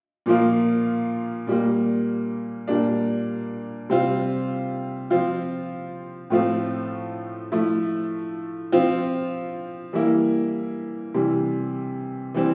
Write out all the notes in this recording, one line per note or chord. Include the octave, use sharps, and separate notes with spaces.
A#2 F3 A#3 F4
A#2 G3 A#3
A#2 G3 A#3 D4
C3 G3 C4 F4
F3 C4 F4
A2 F3 A3 C4 F4
F3 A3 E4
F3 C4 F4
E3 G3 A#3 E4
C3 E3 G3
E3 G3 C4